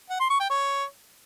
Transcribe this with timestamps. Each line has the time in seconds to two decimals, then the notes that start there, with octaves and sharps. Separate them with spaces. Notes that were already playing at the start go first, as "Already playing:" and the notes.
0.10 F#5
0.20 C6
0.30 C#6
0.40 G5
0.50 C#5